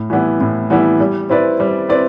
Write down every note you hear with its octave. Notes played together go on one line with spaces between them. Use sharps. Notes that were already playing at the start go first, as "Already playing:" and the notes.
Already playing: A2
E3 G3 B3 E4
A2
E3 G3 B3 E4
G3
C4 E4 B4 D5
G3
C4 E4 B4 D5